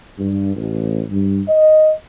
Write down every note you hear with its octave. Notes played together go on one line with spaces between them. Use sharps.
G2
A1
G2
D#5